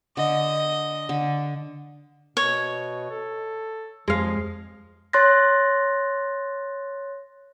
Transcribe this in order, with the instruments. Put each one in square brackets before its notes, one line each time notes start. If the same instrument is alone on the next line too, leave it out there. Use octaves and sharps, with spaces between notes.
[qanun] D3 [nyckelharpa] D#5
[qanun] D3
[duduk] B2 [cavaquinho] C#5
[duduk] A4
[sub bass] F2 [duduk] F3 [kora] G#3 F5
[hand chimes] C#5 C6 F#6 A6 A#6